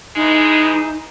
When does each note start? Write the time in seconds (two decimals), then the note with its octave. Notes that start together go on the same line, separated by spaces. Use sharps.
0.16 E3 G#3 D#4